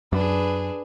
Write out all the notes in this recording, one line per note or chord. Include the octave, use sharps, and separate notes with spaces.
F#2 D4 G#4 B4